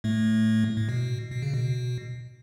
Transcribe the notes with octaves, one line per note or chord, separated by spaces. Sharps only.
A2 A3
A2
B2
B2
C#3
B2